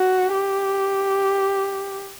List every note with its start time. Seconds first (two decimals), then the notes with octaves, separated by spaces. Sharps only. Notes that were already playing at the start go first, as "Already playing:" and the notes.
Already playing: F#4
0.34 G4